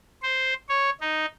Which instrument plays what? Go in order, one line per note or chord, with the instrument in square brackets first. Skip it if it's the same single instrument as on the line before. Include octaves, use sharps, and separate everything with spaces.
[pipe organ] C5
C#5
D#4